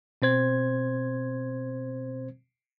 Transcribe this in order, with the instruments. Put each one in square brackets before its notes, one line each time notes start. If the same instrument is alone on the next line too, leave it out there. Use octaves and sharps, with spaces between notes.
[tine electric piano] B2 C4 C5 G#6